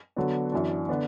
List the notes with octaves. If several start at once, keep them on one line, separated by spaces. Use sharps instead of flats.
D3 F#3 B3 D4
F#2 E3 D4
D3 B3 D4